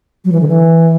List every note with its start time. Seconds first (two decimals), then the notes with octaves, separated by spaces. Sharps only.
0.25 F#3
0.32 E3
0.41 D3
0.48 E3